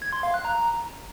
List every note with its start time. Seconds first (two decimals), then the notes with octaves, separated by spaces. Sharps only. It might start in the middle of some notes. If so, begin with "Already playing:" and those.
0.02 G#6
0.13 C6
0.23 F5
0.34 F#6
0.45 A#5